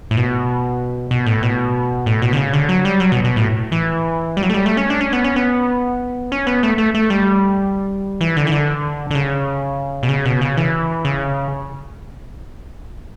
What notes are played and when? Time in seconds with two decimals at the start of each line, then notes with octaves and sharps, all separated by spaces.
0.11 A2
0.17 B2
1.11 B2
1.26 A2
1.43 B2
2.06 A2
2.22 B2
2.33 D3
2.37 C#3
2.53 D3
2.69 F#3
2.85 G3
3.00 F#3
3.12 B2
3.24 B2
3.36 A2
3.72 E3
4.37 G3
4.43 F#3
4.50 A3
4.54 G3
4.66 A3
4.77 C#4
4.90 D4
5.01 C#4
5.13 B3
5.24 C#4
5.36 B3
6.32 C#4
6.47 B3
6.63 A3
6.78 A3
6.94 A3
7.10 G3
8.21 E3
8.37 D3
8.47 E3
8.52 D3
9.11 D3
9.15 C#3
10.03 B2
10.09 C#3
10.25 B2
10.41 C#3
10.57 E3
11.05 C#3